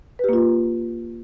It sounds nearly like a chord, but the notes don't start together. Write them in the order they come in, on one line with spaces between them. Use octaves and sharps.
B4 G4 A#3 F4